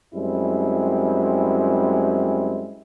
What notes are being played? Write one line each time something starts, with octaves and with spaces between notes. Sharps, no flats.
F#2 G3 G#3 C4 E4